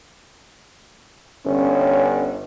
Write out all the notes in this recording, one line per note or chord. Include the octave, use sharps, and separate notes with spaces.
G1 C#4